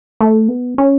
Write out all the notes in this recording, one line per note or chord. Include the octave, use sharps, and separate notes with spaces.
A3
B3
C#4